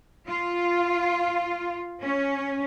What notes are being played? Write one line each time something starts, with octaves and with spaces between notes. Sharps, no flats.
F4
C#4